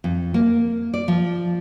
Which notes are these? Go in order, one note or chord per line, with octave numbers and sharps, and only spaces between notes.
F2
A#3
D5
F3